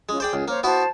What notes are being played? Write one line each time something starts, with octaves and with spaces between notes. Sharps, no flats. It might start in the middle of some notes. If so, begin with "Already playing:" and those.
G#3 C#4 F4
G#4 C5 D5 G5
C#2
A#3 C5 C#5
B3 E4 F#4 C5 A5